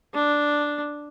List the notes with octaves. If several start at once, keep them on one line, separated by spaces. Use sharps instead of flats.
D4